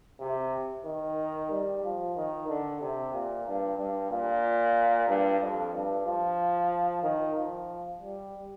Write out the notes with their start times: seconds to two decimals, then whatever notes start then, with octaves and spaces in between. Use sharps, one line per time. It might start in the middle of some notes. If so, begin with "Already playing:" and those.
0.20 C3
0.85 D#3
1.51 G3
1.84 F3
2.16 D#3
2.48 D3
2.81 C3
3.13 A#2
3.46 G2
3.78 G2
4.10 A#2
5.08 G2
5.41 F2
5.73 G2
6.05 F3
7.03 D#3
7.36 F3
8.01 G3